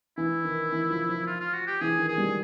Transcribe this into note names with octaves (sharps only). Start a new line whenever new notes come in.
E3 E4
D#3
E3
F3
F3
F4
F4
F#4
G4
E3 G#4
D#3
G#4
G3